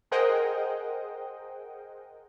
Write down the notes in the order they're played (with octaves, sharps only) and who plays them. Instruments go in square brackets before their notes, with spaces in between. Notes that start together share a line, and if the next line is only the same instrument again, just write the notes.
[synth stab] G#4 A#4 C5 D#5 F#5 G5